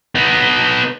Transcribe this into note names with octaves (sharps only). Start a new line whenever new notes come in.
B3 D#4